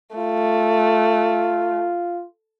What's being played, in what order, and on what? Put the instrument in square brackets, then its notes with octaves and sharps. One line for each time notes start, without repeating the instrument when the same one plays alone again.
[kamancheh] A3 [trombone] F4